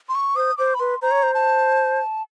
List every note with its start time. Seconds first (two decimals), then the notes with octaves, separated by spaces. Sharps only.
0.09 C6
0.15 C#6
0.36 C5 D#6
0.58 C5 D6
0.74 B5
0.80 B4 C6
1.02 C5 A#5
1.11 C#5
1.23 C5
1.34 A5